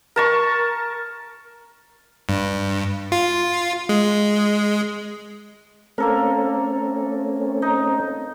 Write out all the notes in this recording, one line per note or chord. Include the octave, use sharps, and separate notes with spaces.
A#4 A5 C#6
G2
F4
G#3
A3 A#3 C4 C#4 A4 A#4
D#4